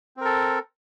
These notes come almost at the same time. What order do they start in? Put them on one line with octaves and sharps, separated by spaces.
C4 A#4 A4